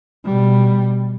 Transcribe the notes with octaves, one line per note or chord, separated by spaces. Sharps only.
B2 G3